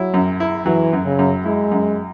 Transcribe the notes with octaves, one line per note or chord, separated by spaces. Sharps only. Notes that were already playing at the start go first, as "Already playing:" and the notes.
Already playing: F#3 E4
F#2
E4
E3 F#3
F#2
C#3
F#2
G#3 E4
F#2